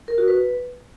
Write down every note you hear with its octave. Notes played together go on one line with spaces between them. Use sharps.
A#4
F#4
B4